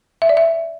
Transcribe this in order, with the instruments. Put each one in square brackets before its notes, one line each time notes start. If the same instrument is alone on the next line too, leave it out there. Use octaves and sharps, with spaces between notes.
[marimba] E5
D5
E5